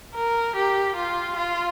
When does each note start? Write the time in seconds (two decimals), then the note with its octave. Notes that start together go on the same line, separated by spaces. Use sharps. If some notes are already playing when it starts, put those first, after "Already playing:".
0.15 A#4
0.56 G4
0.96 F4
1.36 F4